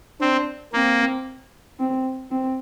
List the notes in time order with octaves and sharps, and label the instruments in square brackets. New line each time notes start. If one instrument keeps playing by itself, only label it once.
[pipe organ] C4 [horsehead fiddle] D4
[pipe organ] A#3 [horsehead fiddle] C4
[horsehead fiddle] C4
C4